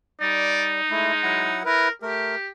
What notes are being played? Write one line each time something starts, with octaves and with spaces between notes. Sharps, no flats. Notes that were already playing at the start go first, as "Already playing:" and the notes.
G3 D#4 D5
G#3 A3 E4
F#3 E4 F#5
E4 A#4 B4
A3 G4 A#4